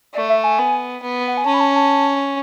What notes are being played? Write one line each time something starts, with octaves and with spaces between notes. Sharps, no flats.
A3 D5
E5
G#5
B3
B3
F#5
G#5
C#4 A5
B5
A5
A5